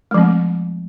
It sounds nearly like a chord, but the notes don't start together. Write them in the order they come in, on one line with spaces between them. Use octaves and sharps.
G#3 F3 C4 A3